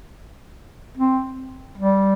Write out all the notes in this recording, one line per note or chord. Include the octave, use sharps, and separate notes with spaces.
C4
G3